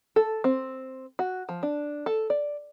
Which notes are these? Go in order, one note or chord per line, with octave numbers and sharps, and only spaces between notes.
A4
C4
F#4
F3
D4
A4
D5